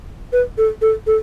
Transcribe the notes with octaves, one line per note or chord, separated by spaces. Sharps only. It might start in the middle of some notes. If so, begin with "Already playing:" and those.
B4
A4
A4
A4